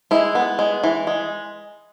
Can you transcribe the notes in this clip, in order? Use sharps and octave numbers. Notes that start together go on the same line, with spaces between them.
G#3 E4
B3
G#3
E3
G#3